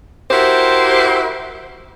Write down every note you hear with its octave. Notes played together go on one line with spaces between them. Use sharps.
E4 F#4 G4 A#4 C5